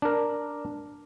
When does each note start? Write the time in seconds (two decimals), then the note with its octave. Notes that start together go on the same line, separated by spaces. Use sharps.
0.02 D4 A#4